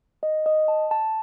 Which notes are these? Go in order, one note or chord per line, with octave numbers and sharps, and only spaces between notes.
D#5
D#5
A5
A5